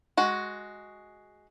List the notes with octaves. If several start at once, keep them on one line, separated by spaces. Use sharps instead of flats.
G#3 F#4